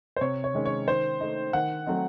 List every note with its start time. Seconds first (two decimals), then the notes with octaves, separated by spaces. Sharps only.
0.16 C5
0.21 C3 C#5
0.44 C#5
0.54 D#3 G#3 C#4
0.65 C#5
0.87 D#3 C5
1.21 A3 D#4
1.53 D#3 F#5
1.86 F#3 A3 C4 D#4